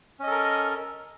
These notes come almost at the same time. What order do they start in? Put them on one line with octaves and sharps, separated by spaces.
C#4 D#5 A4 A#4